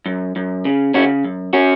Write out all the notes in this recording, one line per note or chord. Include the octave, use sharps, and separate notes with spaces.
F#2
F#2
C#3
C#3 C#4 F#4
F#2
C#4 F#4